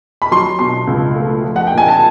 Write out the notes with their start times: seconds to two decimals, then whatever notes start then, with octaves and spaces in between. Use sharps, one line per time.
0.22 B5
0.31 F#3 C6
0.59 B2 C6
0.87 C#2
1.16 A3
1.43 F3
1.56 F#5
1.67 A#2 G5
1.78 G#5
1.88 A5